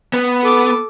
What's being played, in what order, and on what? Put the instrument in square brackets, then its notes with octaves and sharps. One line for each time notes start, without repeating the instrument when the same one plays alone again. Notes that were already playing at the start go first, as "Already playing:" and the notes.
[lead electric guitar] B3
[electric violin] A4 D6